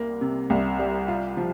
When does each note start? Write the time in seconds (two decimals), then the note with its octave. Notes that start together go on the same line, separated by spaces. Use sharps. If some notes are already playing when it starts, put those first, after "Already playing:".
Already playing: C2 G3 A#3
0.21 C3
0.50 C2
0.79 G3
1.08 F4
1.37 F3